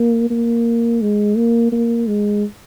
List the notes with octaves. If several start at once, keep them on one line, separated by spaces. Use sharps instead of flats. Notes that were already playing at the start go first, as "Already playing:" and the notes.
Already playing: A#3
A#3
G#3
A#3
A#3
G#3